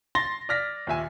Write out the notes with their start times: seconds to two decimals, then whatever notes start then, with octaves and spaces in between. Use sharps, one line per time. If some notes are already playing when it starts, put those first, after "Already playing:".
0.15 C6 A6 A#6 G7
0.49 D5 F6 A#6 B6
0.87 D#2 A#2 E5 G#5